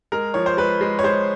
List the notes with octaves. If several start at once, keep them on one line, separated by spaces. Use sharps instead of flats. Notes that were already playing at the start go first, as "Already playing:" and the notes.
G#3 A#4
F3 C#5
C5
G#3 B4
G#3
C#5
G#3 C5